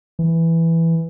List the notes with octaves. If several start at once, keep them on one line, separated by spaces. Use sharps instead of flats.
E3